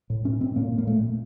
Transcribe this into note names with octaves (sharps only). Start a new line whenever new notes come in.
A2
A2 C#4
A2 C4
A2 A#3
A2
A#3
A#2 A3
A#2